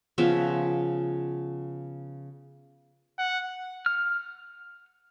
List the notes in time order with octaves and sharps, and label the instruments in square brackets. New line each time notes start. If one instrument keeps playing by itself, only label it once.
[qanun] C#3 F3 B3 E5
[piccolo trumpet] F#5
[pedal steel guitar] F6